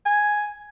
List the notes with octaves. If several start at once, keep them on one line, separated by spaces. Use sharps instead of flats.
G#5